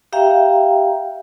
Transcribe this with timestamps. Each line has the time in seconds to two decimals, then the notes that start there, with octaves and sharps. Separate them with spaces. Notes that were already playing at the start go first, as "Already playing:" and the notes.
0.13 G4 E5 F5 G5 A#5